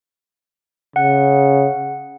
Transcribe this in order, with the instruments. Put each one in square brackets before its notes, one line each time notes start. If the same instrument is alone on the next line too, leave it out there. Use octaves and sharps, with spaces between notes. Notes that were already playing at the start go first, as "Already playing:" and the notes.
[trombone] C#3 [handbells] F#5